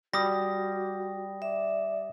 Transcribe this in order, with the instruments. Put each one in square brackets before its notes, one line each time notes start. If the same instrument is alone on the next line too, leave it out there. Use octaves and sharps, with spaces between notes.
[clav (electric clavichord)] G3 [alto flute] F#4 [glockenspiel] D#6 A#6
[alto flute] D5 [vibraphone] E5